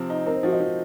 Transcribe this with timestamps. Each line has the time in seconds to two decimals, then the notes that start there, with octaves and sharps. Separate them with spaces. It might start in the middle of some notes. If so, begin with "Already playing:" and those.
Already playing: C3 F3 C4
0.10 D#4
0.26 C4 A#4
0.36 C5
0.43 F3 F#4
0.52 D#5
0.60 F3